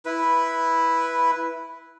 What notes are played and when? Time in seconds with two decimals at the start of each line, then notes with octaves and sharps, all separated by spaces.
0.06 E4 B4